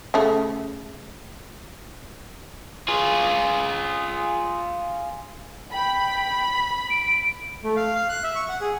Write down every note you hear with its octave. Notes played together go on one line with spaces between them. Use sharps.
C#3 A3
F4 G#4
G5 B5
D7
A3
F5
F5
F#6
E5
C#6
F#5
G#4